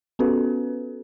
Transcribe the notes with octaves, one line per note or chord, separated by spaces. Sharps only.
B3 C#4 F#4 A4 B4